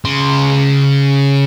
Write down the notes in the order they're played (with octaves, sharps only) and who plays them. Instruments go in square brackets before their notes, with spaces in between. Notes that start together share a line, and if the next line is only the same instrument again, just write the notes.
[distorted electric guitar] C#3 C6